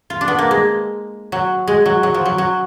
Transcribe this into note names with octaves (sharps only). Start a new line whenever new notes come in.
F4
D4
B3
A#3
G#3
F#3
G#3
F#3
F#3
F3
F#3
F#3